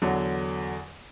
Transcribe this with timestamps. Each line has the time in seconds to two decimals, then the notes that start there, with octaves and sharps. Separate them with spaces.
0.02 E2 D3 F#3